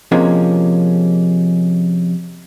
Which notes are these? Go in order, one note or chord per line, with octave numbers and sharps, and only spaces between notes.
C3 F3 G#3 A#3 C#4